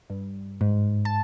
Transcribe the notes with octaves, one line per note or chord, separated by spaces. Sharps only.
G2
G#2
A5